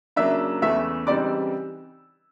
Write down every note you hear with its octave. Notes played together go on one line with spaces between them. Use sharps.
C#3 F#3 A#3 D4 E5 E6
E2 C#3 E3 A3 E5 E6
C#3 E3 G3 C4 D#4 D5 D6